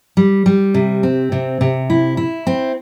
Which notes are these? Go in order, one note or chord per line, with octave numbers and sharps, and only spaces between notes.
G3
G3
C3
C4
C3
C3
E4
E4
C4